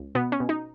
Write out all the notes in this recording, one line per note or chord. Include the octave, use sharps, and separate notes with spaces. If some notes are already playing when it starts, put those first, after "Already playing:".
Already playing: C#2
B2 B3
C#4
B2
D#4